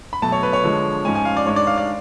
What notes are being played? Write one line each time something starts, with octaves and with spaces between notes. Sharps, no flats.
B5
B2 F#3 A3 A5
C#5
B4
C#5
D3 F3 G#3
G#2 F3 G#3 C#4 G#5
G#5
F5
D5
G#2 G#3 D4 C#5
D5
F5
D5